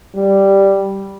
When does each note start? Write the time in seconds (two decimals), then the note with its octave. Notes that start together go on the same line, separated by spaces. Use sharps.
0.15 G3